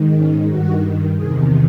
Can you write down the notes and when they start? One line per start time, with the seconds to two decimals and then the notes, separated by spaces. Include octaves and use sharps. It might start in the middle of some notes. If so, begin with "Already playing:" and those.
Already playing: G#2 D#3
0.15 C#4
0.48 G2 D#3 F#4
1.15 E2 C3 D#3 G#4